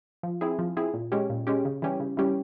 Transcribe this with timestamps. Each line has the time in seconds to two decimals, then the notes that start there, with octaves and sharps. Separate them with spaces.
0.23 F3
0.41 C4 E4 G#4
0.59 F3
0.77 C4 E4 G#4
0.94 A#2
1.12 G#3 C#4 G4
1.30 A#2
1.47 G#3 C#4 G4
1.65 C#3
1.82 E3 G3 C#4 G4
2.00 C#3
2.17 E3 G3 C#4 G4